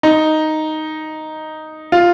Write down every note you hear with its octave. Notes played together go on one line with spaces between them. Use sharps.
D#4
F4